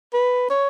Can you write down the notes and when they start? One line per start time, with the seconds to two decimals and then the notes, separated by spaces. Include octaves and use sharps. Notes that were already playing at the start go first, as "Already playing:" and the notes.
0.13 B4
0.50 C#5